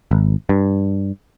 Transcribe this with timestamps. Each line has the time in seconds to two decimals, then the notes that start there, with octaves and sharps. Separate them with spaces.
0.11 G#1
0.49 G2